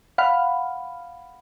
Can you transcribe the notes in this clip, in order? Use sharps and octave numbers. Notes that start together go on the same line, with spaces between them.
F5 F#5 B5 F6